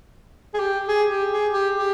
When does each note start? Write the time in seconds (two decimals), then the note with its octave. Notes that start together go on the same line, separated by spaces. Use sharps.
0.54 G#4
0.59 G4
0.88 G#4
1.10 G4
1.32 G#4
1.54 G4
1.75 G4